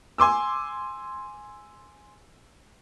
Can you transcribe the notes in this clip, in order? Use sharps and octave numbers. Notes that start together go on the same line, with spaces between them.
G#5 C6 D6 E6